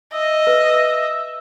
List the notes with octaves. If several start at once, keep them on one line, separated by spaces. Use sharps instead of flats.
D#5 E5
B4